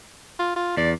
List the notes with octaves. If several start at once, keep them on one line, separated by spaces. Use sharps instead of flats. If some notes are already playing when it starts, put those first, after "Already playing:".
F4
F4
E2 D5